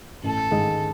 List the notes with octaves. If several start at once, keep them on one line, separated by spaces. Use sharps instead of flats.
A1 A4
G#2 D#3 G#3